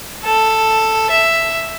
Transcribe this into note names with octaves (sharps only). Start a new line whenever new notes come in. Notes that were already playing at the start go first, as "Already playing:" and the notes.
A4
E5